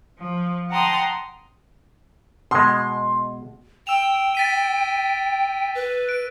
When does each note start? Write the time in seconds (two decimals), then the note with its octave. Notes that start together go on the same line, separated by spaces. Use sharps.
0.19 F3
0.70 F#5 G5 A5 A#5 C6 D#6
2.51 B2 G#3 C6
3.87 G5 E6 E7 F7
4.35 A6 B6 D#7
5.75 B4
6.09 D7